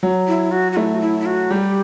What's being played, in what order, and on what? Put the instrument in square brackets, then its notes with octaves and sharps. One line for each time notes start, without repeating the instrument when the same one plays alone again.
[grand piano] F#3
[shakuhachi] E4
F#4
F#4
[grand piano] A3 [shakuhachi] E4
[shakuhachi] F#4
E4
E4
F#4
[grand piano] G3 [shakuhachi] G4